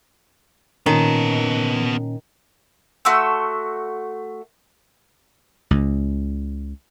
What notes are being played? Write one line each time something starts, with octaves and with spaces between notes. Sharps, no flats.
A#2 D#3 B3 C#4 A5
A3 F#4 C6 E6
C#2